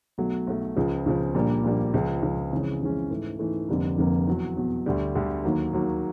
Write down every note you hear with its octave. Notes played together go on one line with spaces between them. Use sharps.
B1 B2 F#3 A3
B1 B2 F#3 A3
C#2 C#3 F3
C#2 C#3 F3
A#1 A#2 G3 A#3 D4
A#1 A#2 G3 A#3 D4
C#2 C#3 F3
C#2 C#3 F3
F2 C#3 E3 G#3 C#4
F2 C#3 E3 G#3 C#4
G#2 E3 A3
G#2 E3 A3
F1 F2 D3 G3 A#3
F1 F2 D3 G3 A#3
E2 B2 F#3
E2 B2 F#3
D2 D3 G3
D2 D3 G3
D#2 D#3 F#3 A#3
D#2 D#3 F#3 A#3